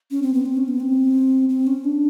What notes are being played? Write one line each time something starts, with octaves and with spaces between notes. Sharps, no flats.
C#4
C4
B3
C4
C#4
B3
C4
C4
C#4
D4